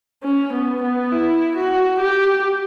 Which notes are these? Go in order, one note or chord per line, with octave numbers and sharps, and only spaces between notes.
C#4
B3
B3
E4
F#4
G4